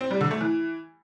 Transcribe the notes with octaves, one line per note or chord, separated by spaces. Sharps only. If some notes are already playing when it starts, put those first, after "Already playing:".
C4
G3
D3
A3
E3